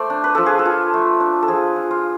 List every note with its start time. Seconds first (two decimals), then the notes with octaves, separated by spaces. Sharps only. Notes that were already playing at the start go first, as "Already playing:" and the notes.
Already playing: A3 C5 D5
0.10 D4
0.24 B4
0.35 F3 A4
0.46 G#4
0.59 A4
0.65 F4
0.94 A3
1.20 D4
1.43 A4
1.48 F3 G#4
1.76 F4
1.91 F4